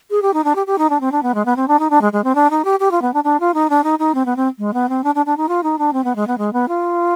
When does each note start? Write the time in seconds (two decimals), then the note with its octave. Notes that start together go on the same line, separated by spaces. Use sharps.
0.11 G#4
0.22 G4
0.34 D#4
0.44 D4
0.55 G4
0.67 G4
0.78 D#4
0.90 D4
1.01 C4
1.12 D4
1.23 B3
1.34 G#3
1.45 B3
1.56 C4
1.68 D4
1.79 D#4
1.90 D4
2.01 G#3
2.13 G#3
2.24 C4
2.35 D4
2.50 D#4
2.65 G4
2.80 G4
2.91 F4
3.02 B3
3.14 D4
3.24 D4
3.40 F4
3.54 D#4
3.70 D4
3.84 D#4
3.99 D#4
4.15 C4
4.26 B3
4.36 C4
4.58 G#3
4.74 B3
4.89 C4
5.04 D4
5.15 D4
5.26 D4
5.37 D#4
5.49 F4
5.63 D#4
5.79 D4
5.93 C4
6.04 B3
6.16 G#3
6.27 B3
6.38 G#3
6.53 B3
6.68 F4